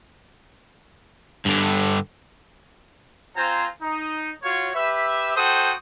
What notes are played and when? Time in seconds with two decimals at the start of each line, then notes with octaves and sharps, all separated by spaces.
1.46 G2 D3
3.35 C4 F4 C5 G#5 A#5
3.81 D#4
4.42 F4 F#4 C#5
4.75 G4 B4 E5
5.36 F#4 A4 C5 G5 D#6